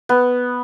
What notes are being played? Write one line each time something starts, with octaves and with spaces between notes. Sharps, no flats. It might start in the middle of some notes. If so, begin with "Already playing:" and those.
B3